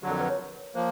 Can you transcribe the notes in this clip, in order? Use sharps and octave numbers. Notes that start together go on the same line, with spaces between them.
F2 D3 F#3 G4
A#4
B4
C#5
F3 A#3 C5